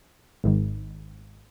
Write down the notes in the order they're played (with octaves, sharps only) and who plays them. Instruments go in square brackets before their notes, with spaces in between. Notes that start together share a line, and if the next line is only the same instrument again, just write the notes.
[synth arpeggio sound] G#1 G#2 D#3